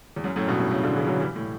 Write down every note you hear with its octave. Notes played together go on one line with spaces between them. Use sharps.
E2
F#2
F#2 A2
G2 B2
F#2 A2
A2 C#3
B2 D3
C#3 E3
D3 F#3
E3 G3
A2